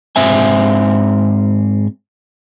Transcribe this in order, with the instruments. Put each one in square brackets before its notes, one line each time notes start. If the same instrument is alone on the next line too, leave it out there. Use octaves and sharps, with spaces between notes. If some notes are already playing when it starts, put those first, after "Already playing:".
[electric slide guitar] G#2 C4 E5 G#5